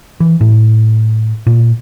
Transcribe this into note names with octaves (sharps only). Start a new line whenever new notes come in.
E3
A2
A#2